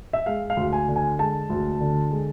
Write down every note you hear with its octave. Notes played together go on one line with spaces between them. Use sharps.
E5
G#3 F5
F5
D2
G#5
D3
G#5
G#3 A5
D2
D3
G#3